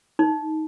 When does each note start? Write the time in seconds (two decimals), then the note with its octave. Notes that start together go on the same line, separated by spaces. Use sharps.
0.19 D#4